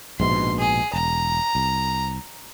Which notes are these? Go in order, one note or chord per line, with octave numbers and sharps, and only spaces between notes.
A#1 G#2 B2 C6
G#4
E1 A#5
C2